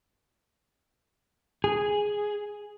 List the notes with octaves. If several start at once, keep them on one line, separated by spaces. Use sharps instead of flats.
G#4